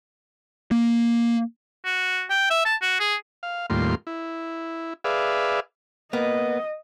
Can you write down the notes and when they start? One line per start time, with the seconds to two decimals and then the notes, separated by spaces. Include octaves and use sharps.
0.71 A#3
1.85 F#4
2.30 G5
2.50 E5
2.65 A5
2.82 F#4
3.00 G#4
3.43 F5
3.70 D#2 A2 G3 A#3 F4 C6
4.07 E4
5.04 G#4 B4 D5 E5 F5
6.13 A#3 B3 D#5